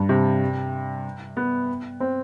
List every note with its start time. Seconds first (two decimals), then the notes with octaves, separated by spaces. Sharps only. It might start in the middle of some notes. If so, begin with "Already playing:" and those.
Already playing: G2
0.09 C3
1.37 B3
2.00 C4